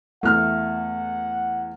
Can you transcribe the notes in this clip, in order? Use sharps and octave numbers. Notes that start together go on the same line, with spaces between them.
E2 A3 F#5 F6